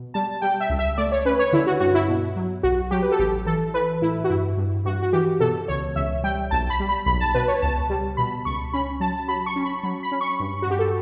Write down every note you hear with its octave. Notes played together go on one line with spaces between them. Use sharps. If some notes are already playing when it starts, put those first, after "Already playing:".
Already playing: B2
G3 A5
G3 G5
E5
C#2
E5
A3 D5
C#5
C#4 B4
C#5
D3 E4
F#4
G2 F#4
E4
B2
F#3
B1 F#4
F#3 G4
B4
A4
A1 G4
E3 A4
E3 B4
A2 E4
F#4
G2 E4
G2
G2 F#4
F#4
E3 G4
B2 A4
C#2 C#5
C#2 E5
G3 G5
B1 A5
B5
G3
B5
B1 B5
A5
B2 B4
C#5
C#2 A5
G3
B2 B5
C#2 C#6
C#4 B5
F#3 A5
F#3 B5
C#6
C#4
B5
F#3 B5
B5
C#4
C#6
G2
F#4
G2 G4
A4